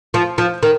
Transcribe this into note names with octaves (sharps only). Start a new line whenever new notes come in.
F3
F3
D#3